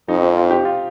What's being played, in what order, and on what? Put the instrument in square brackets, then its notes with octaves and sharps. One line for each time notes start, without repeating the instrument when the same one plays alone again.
[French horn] F2 [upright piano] D#4
[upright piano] C4
F4
G4
F4